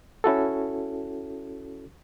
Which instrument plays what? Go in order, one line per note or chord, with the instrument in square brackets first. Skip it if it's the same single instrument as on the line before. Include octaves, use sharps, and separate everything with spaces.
[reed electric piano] C#4 E4 F#4 A4